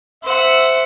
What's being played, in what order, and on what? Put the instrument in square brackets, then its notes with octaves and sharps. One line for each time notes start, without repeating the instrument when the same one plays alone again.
[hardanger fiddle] C5 F#5 [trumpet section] E5